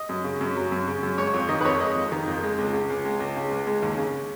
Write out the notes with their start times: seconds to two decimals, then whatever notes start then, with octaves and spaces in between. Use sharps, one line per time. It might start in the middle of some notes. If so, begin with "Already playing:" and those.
Already playing: D#5
0.09 F#2
0.24 C#3
0.41 F#2
0.56 F#3
0.72 F#2
0.87 C#3
1.03 F#2
1.18 G#3 C#5
1.33 F2 C#5
1.49 D#3 D#5
1.61 B4
1.65 F2 C#5
1.80 G#3 D#5
1.96 F2
2.12 D#3
2.27 F2
2.43 G#3
2.58 C#2
2.73 C#3
2.90 C#2
3.05 G#3
3.20 C#2
3.36 C#3
3.51 C#2
3.67 G#3
3.83 D#2
3.98 C#3